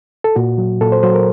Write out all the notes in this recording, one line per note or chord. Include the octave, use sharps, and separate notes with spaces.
A4
A#2 F#4
F#3
A#2 A4
C5
F#3 C5
A#4